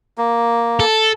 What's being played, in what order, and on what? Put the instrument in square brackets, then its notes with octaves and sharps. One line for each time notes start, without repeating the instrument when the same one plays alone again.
[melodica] A#3
[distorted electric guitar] A4